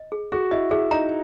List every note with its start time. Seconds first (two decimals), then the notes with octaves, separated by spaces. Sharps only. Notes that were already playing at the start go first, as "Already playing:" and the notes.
Already playing: D#5
0.12 G#4
0.32 F#4 G#4
0.51 E4 D#5
0.71 E4 G#4
0.91 D#4 A#5